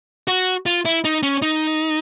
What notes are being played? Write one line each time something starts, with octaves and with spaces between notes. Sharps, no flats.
F#4
F4
E4
D#4
C#4
D#4